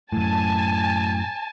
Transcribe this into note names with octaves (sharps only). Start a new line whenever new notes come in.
F#2 A2 G#5 A5